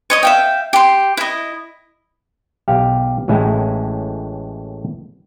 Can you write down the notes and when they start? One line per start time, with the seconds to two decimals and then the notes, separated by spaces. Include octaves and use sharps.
0.10 C#5 D#5 D#6
0.23 E5 F5 G5
0.73 G4 C6
1.17 E4 D#5
2.68 B1 G4 F5
3.28 A1 A2 G#3 E4